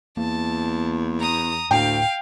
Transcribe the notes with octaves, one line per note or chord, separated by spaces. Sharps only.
E2 A#3 A5
A#5 D#6
D2 A2 F5 G5